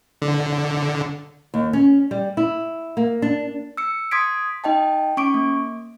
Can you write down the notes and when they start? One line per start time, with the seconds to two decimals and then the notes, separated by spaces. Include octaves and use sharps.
0.22 D3
1.54 D#2
1.73 C#4
2.11 G3
2.37 E4
2.97 A#3
3.22 D4
3.77 E6 C#7
4.11 C6 D#6 G#6 B6 D7
4.64 D#4 D#5 G5 A5
5.17 C#4 C#6 D6 D7
5.34 A#3